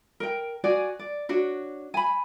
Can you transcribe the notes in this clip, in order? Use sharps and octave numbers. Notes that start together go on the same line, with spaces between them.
A#4 G5
F#4 G#4 D5 G#5
D5
D4 F#4 C#5
G#5 B5